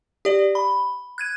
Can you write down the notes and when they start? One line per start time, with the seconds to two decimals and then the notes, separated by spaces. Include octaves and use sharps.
0.25 G4 D5
0.55 B5
1.18 F#6 G#6 D#7